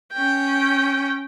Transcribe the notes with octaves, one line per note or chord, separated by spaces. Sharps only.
C#4 G5